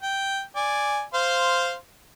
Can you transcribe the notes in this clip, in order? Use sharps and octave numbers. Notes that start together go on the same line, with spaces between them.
G5
D5 G#5
C5 F5 C6